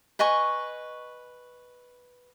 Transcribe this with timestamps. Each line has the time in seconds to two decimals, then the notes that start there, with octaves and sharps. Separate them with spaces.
0.19 B4 D#5 G#5 C#6